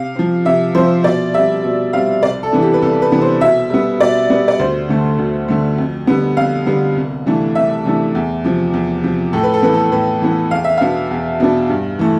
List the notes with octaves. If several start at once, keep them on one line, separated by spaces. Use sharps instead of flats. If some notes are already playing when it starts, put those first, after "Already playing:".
Already playing: C3 F5
F3 C4
C3 E5
F3 C4 C5
B2 D5
G3 C4 E5
B2
G3 C4 F5
C2 D5
A4
C3 E3 B3 D4
G4
B4
C2 A4
B4
C3 E3 B3 D4
C5
B2 E5
G3 B3
B2 D5
G3 B3
D5
D2 C5
D3 A3
D2
D3 A3
F2
D3 G3 B3
F2 F5
D3 G3 B3
C2
C3 E3 A3 D4
C2 E5
C3 E3 A3 D4
E2
C3 F3
E2
C3 F3
A2 A4
B4
A4
E3 B3 B4
A4
A2 B4
E3 B3
E2 F5
E5
B2 B3 D4 F5
E2
B2 B3 D4
G2
E3 A3